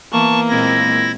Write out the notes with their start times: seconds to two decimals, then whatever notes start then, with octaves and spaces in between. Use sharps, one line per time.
0.12 E3 A#3 B3 A5 C#6
0.49 A#2 G#3 C4 E4 A#6